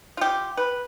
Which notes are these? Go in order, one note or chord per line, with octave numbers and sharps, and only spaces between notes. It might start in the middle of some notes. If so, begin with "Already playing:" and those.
F4 G4
B4